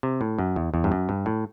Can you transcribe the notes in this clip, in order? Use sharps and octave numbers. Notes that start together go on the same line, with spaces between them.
C3
A2
F#2
E2
E2
G2
F#2
G2
A2